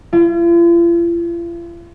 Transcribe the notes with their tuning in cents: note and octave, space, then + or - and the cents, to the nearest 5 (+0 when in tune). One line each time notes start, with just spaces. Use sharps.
F4 -45